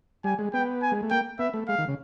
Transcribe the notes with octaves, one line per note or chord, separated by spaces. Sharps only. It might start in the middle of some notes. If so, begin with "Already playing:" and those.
G3 G#5
G#3
B3 G5
G#5
G#3
A3
A#3 G5
B3 E5
A3
G#3 F5
D#3
C#3